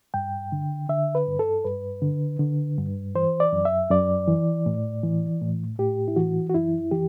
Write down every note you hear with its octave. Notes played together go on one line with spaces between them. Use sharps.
G2 G5
D3
D3 E5
B4
G2
A4
G2 B4
D3
D3
G2
E3 C5
D5
F#2
E5
F#2 D5
E3
A2
E3
A2
A2 G4
E4
E3 F#4
F#4
F#2 E4
E3 G4